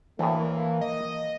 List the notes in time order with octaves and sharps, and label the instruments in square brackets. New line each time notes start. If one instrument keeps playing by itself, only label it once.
[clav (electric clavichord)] D2 A2 [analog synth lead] E3 [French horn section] A#3
[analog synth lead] D#5